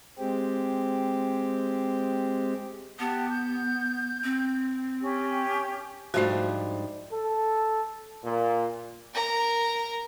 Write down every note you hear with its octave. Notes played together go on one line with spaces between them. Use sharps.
G#3 C4 G4
B3 G4 F#5 A5
G6
C4
C#4 G4
G#2 F3 G3 A3 D4 F#4 C5 F5
A4
A#2
A#4 A#5